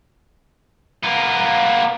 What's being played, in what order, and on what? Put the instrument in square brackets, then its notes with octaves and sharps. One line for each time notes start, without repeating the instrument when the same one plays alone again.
[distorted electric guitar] A#3 B3